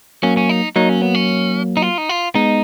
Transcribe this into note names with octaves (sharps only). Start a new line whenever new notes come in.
F#3 A#3 C#4
C#4
D#4
F#3 A#3 D#4
C#4
B3
C#4
D#4
F4
D#4
F4
G#3 B3 D#4